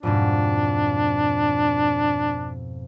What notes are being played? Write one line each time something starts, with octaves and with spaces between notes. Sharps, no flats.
F2 G#2 B2 D4